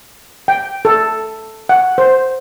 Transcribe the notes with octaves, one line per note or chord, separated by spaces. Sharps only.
G5
A4
F#5
C5